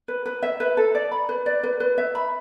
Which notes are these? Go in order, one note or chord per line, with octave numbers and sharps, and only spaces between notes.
B4
B4
E5
B4
A4
D5
B5
B4
D5
B4
B4
E5
B5